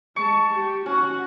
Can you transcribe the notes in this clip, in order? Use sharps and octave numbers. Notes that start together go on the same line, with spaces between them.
G#3 A5 C#6
G4
C#4 F#4 F#5